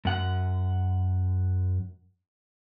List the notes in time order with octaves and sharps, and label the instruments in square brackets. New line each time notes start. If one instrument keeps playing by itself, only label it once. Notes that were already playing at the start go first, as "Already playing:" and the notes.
[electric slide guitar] F#2 F#5